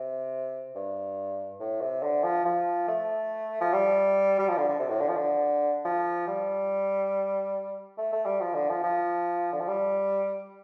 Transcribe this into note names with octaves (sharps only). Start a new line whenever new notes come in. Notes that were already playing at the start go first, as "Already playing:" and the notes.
Already playing: C3
G2
A2
C3
D3
F3
F3
A3
F3
G3
G3
F3
D3
D3
C3
A2
D3
F3
D3
F3
G3
A3
A3
G3
F3
D3
F3
F3
D3
F3
G3